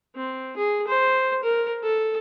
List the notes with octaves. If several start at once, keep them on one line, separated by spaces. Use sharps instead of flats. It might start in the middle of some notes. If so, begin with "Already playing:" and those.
C4
G#4
C5
A#4
A4